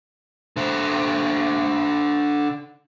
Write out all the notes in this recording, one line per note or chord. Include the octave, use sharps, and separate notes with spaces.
D3 C5